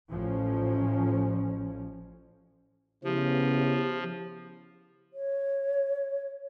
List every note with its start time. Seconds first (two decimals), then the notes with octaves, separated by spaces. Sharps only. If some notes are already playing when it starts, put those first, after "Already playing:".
0.10 A1 F3 C#4
3.04 C#3 F3 B3 E4 G4
5.14 C#5